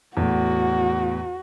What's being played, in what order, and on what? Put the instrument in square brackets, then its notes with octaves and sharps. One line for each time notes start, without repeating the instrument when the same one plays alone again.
[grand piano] E2 A2 [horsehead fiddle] F#4